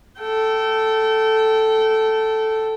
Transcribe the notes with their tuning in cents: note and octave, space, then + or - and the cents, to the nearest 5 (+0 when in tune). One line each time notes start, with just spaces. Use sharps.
A4 +0 G5 -30